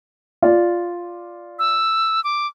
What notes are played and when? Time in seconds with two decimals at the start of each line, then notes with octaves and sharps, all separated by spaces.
0.42 F4 D5
1.59 E6
2.24 D6